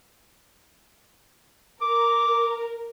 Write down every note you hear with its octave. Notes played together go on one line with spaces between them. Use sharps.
A#4 D6